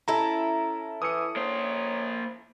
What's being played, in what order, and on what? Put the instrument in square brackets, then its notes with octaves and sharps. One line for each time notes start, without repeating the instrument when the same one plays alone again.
[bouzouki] C#4 E4 A4 [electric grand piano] A#5
[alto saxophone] E3 [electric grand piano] D#6 C#7
[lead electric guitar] A#3 C5 [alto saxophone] C#5